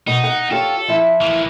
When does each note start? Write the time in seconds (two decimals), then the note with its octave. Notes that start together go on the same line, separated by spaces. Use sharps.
0.07 B2 D#4
0.24 F#5
0.51 F4 G4 A4 C#5
0.88 F3 E4
1.21 E3 A#3